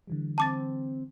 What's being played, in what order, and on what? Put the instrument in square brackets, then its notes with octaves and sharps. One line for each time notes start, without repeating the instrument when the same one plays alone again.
[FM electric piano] D3 E3 G3
[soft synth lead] C4 [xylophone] A5 D6 A6